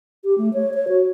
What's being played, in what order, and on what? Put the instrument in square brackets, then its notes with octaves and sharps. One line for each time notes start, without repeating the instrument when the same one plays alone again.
[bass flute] G4
A3
C#5
C#5
F#4